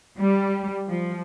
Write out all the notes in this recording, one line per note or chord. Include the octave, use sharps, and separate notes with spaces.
G3
F3